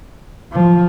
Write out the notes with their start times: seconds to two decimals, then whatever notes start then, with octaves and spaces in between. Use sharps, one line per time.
0.52 F3